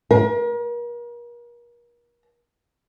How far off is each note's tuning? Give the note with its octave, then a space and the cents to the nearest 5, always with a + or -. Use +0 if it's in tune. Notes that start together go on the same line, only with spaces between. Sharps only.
A#4 +40